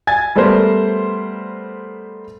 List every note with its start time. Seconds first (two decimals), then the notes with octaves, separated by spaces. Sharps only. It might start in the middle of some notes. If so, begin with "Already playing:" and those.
0.07 G#5 G#6 A6
0.36 G3 A3 B3 A#4 C5